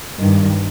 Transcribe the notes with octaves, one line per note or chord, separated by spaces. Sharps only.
G2 D#3